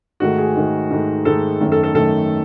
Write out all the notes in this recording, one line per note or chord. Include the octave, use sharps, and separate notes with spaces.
G#2 D#3 A3 F#4
G#4
G#2 D#3 A3
G#2 D#3 A3
G#2 D#3 A3 A4
F#2 D#3 A3
A4
A4
F#2 D#3 A3 A4